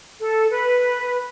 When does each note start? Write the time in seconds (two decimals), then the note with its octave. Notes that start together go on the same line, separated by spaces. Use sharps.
0.20 A4
0.51 B4